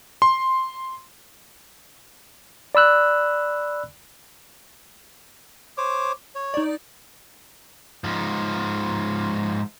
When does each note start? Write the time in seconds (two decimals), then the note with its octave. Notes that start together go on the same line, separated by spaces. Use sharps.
0.22 C6
2.75 D5 B5 E6 F#6
5.78 C5 C#5 D6
6.35 C#5
6.54 D#4 D5
8.04 G#2 F3